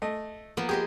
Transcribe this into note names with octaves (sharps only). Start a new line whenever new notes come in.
A3 D#5
F3 A#3 B3
G4 G#4 C5 D#5